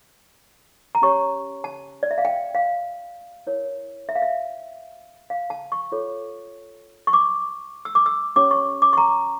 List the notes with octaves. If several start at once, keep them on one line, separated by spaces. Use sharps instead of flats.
A#5
C#4 G4 C#5 C#6
A5
D5
E5
F5
G5
F5
E4 A#4 C#5
E5
F5
E5
F5
A5
C#6
F4 A4 C#5
C#6
D6
E6
D6
E6
C#4 G4 C#5 D6
C#6
D6
C#6
A#5